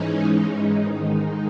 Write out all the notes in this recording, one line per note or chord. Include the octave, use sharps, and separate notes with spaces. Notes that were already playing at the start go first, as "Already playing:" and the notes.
Already playing: G#2 E3 G#3 C#4 D#4
D#4
G#2 D#3 G#3